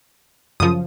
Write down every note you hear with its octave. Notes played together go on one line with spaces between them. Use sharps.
F#2 C#3 F3 D#6